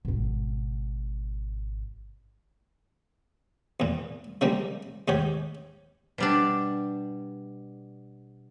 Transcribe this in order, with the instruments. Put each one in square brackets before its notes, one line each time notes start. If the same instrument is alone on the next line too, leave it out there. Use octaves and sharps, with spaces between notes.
[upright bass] G#1 B2
[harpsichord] E2 A#2
C#3 F3 G3 G#3 A#3
D#2 G#2 G4 C#5
[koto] B2 G3 D4